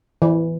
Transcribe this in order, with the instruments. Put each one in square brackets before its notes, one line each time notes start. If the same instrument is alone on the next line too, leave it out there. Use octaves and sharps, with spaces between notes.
[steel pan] E3